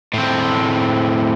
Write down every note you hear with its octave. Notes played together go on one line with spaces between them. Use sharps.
A2 C4